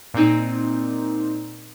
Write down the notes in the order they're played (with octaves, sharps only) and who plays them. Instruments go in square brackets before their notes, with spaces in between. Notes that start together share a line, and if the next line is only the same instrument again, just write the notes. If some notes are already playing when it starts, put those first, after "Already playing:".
[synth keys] A#2 A#3 C4 D#4